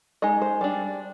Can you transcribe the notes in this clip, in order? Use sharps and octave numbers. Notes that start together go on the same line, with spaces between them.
G#3 D#4 D#5
C5
G3 D4